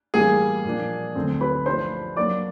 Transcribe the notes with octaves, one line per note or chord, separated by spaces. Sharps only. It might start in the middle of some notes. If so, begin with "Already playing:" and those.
A2 E3 G3 A#3 G#4 G#5
A#2 F3 A#3 D4
D2 D3 F#3 A3 C4
B4 B5
F3 A3 D4 C5 C6
F#3 A#3 D4 D5 D6